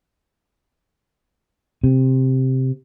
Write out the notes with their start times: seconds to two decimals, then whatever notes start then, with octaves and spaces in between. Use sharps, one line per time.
1.84 C3